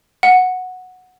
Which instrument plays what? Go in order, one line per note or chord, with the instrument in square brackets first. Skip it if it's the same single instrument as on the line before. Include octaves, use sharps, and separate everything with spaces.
[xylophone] F#5